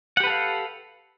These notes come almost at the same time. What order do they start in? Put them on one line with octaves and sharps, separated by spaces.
F#5 G4 B4 A4 F5